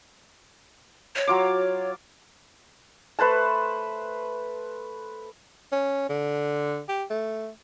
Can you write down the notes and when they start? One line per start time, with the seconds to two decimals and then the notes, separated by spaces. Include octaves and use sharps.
1.16 C#5
1.27 F#3 F4 D6
3.19 A3 B4 C5 A5
5.72 C#4
6.09 D3
6.89 G4
7.10 A3